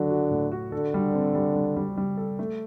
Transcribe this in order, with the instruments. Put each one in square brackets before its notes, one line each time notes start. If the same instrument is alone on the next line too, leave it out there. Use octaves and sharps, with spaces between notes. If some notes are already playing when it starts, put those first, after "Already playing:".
Already playing: [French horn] D3 [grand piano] F#3 F#4
[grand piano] F#4
A2
F#4
[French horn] D3 [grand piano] A4
[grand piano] G3
C4
G3
G3
G3
G3
A4
A3